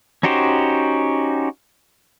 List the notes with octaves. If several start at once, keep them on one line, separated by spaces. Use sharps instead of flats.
C#4 D#4 F#4 G4 C5